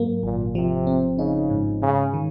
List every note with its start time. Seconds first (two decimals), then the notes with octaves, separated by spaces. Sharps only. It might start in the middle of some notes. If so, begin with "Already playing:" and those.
Already playing: G#2 F#3 A#3
0.23 G#1 A#2
0.55 C3 F3
0.87 C4
1.18 C#3 D#4
1.50 G#2
1.82 G#2 C#3
2.14 D#3